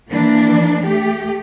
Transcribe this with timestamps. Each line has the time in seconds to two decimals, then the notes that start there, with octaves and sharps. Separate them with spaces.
0.10 E3 A#3 D4
0.84 A3 G4